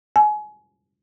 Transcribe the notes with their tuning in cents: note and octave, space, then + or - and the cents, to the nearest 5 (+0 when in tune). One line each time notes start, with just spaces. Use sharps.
G#5 +30